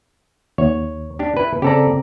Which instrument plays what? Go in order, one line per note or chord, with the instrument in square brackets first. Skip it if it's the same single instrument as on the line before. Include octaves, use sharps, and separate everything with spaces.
[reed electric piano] D#2 [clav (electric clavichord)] C#5
[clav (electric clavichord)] D4 G4
E4 B4
[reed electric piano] C#3 C4 A#5 [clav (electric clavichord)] G4 A4 D5